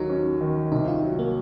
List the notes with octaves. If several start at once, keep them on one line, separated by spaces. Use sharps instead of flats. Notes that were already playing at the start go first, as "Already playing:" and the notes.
Already playing: D#2 F#3 D#4
C#4
D#3
C2 D#4
F4
F#3
A#3